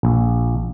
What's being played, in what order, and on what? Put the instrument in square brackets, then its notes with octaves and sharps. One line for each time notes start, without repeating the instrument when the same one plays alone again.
[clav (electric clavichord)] A#1